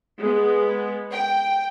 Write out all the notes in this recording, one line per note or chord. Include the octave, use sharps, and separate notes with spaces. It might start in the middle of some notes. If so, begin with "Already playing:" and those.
G#3 B3
G5